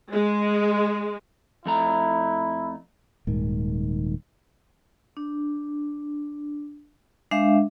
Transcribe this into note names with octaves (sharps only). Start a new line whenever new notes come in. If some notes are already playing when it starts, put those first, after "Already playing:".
G#3
F2 A3 E4 A#5
D#1 G#2 D#3
D4
G#3 D4 E5 F5